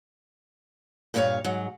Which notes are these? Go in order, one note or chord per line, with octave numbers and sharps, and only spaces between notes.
G2 A#2 D4 F4 C#5 F5
G#2 F#3